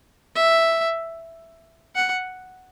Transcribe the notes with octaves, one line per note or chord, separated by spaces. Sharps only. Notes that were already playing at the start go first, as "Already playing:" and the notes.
E5
F#5